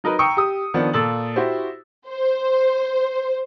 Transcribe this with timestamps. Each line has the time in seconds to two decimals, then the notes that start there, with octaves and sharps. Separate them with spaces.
0.04 F#3 D#4 A#4 B4
0.19 G5 A#5 C#6 D#6 E6 C#7
0.37 G4 D#6
0.74 D#3 F3 B3 D4
0.93 A#2 A4 E6 A6 F#7
1.36 E4 F#4 G4 C5
2.08 C5